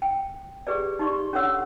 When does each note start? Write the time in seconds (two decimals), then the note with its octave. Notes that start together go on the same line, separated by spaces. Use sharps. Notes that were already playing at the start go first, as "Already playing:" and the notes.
0.02 G5
0.67 G4 G#4 B4 D5
0.99 D#4 G4 D5 C6 C#6
1.33 C#4 D4 A4 C#5 F#5 E6